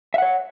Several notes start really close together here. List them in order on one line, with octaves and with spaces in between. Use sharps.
E5 F#5 C#5